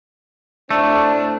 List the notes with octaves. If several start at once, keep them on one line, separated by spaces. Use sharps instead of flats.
A2 A3 C4 D4